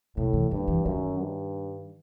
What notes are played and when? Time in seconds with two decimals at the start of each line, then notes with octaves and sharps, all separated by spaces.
0.17 A2 C3
0.33 E3
0.51 G2 D#3
0.68 E3
0.85 F#2 D#3
1.20 G2